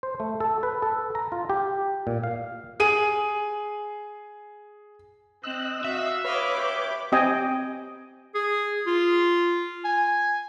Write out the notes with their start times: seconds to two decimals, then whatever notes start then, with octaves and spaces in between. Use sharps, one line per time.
0.03 C5
0.20 A3
0.40 A4
0.63 B4
0.82 A4
1.15 A#5
1.32 F4
1.50 G4
2.07 A#2
2.24 F5
2.80 G#4 D#7
5.44 C4 D#5 E6 F#6
5.84 F#4 E5 F5
6.25 B4 C#5 D#5 F5 B5 D6
6.55 G4
7.12 C4 G4 D#5 G5 G#5
8.35 G#4
8.87 F4
9.85 G#5